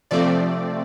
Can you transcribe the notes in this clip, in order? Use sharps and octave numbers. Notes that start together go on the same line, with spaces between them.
C3 F3 A3 C4 D5